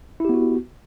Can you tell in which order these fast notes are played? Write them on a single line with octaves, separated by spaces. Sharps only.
E4 G4 B3 F#4